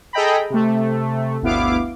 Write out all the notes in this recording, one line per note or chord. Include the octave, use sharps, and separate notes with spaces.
G#4 A4 D#5 G5 A#5 B5
C3 A3
G1 D2 B3 E4 F5 D6